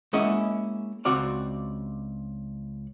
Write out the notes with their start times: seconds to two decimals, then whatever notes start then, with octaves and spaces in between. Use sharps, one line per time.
0.13 G#3 A#3 C#4 E4 D#5 F#5
1.05 C#2 C4 F#4 D5 F5